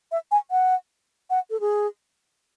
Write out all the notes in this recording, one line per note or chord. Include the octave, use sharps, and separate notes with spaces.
E5
G#5
F#5
F#5
A4
G#4